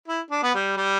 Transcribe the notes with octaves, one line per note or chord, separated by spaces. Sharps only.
E4
D4
B3
G3
G3